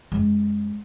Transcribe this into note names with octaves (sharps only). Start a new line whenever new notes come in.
F#2 G#3